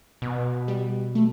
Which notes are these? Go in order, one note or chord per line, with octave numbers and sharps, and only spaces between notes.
B2
G3
A3